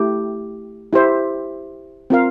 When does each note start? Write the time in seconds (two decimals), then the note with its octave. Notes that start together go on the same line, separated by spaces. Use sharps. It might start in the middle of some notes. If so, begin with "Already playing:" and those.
Already playing: A3 E4 G4
0.93 E4 G4 C5 E5
2.10 C4 F4 A#4 F5